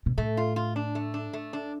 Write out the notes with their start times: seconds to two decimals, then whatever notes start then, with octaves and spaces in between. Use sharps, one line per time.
0.06 B2
0.18 A2 A3
0.37 F4
0.56 F4
0.76 D4
0.95 A3
1.14 D4
1.33 A3
1.53 D4